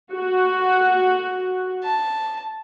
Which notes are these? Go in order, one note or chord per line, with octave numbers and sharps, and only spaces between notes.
F#4
A5